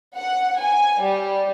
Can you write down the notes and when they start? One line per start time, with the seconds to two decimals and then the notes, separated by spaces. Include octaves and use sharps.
0.16 F#5
0.62 G#5
1.02 G3